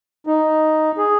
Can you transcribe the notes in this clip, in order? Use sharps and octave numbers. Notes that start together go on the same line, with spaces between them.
D#4
G#4